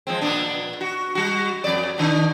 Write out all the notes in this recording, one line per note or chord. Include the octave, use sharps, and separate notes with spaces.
F3 G#3 C4
A#2 B3 D4
F#4
G3 F#4
F2 D5
B2 D#3 D4